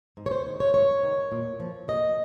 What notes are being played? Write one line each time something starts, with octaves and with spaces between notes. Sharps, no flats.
G#2
C#5
C5
D#3
C#5
G#2 C#5
D#3
A#2
F3
A#2 D#5